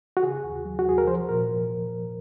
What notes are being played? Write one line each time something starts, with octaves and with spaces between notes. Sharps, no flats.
F#4
C#3 G#4
D#2
F#3
F#4
D#2 G#4
A#4
F3 C5
A#2 A#4